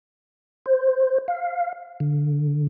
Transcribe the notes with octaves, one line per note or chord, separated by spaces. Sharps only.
C5
F5
D3